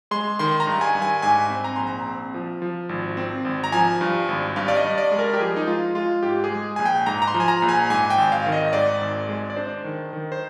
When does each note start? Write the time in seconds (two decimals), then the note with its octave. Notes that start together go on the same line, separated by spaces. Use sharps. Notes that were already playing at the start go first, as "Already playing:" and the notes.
0.11 G#3 C6
0.39 D#3 C6
0.60 A#5
0.67 G2
0.81 G#5
0.95 G2
1.02 G#5
1.22 G#2 G#5
1.50 C4
1.64 A#5
1.76 A#1 C6
1.87 A#5
2.06 C4
2.34 F3
2.62 F3
2.89 G#1
3.17 C4
3.45 G#1
3.64 A#5
3.72 F3 G#5
4.01 G2
4.28 G#1
4.56 G2 F5
4.68 D5
4.77 D#5
4.84 G2
4.98 D5
5.11 G#3
5.19 A#4
5.34 G4
5.39 F3 G#4
5.56 D#4
5.67 G#3 F4
5.95 G#3 F4
6.23 G#2 G4
6.44 G#4
6.51 G#3
6.76 A#1 G#5
6.86 G5
7.06 G#2 A#5
7.22 A#5
7.27 C6
7.34 F3
7.40 G#5
7.48 A#5
7.62 A#1
7.69 G#5
7.90 G#2 G#5
8.10 G5
8.18 G#1
8.32 F5
8.46 D#3
8.52 D#5
8.73 G#2 D5
9.01 G#1
9.29 G#3
9.50 D5
9.57 D4 C5
9.84 D#3
10.13 D#3
10.32 C5